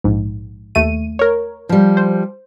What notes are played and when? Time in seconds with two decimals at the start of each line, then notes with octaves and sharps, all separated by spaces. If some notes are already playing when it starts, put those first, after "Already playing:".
0.04 A#1 G#2
0.75 D#2 A3 D#7
1.19 A#4 C#5
1.69 F3 G3
1.97 C5